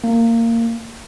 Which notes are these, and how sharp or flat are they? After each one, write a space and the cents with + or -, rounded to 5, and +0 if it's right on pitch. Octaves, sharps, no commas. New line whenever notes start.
A#3 -20